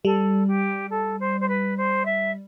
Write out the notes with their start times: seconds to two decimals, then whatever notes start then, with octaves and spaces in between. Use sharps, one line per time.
0.05 G3 A4
0.48 G4
0.90 A4
1.20 C5
1.41 C5
1.48 B4
1.77 C5
2.05 E5